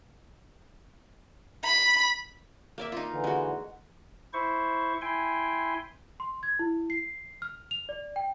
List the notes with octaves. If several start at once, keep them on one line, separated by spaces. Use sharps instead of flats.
B5
A#3 D5 E5
D#4 F4
D3 E3
G#3 F#4
E4 C5 C#6
E4 G5 G#5 C6
C6
G#6
E4
C7
F6
F7
D5
G5